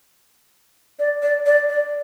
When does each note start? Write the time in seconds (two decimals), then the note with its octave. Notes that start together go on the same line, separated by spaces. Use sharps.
0.99 D5
1.22 D5
1.46 D5
1.69 D5